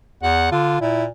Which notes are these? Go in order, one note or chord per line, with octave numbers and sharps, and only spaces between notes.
E2 F#5
D3 F4
A#2 E4